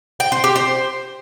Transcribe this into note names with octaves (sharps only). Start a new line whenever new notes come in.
G5
C5
G4
C5